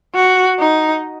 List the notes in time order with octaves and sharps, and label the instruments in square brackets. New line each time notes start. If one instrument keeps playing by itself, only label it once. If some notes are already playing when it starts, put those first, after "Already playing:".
[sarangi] F#4
D#4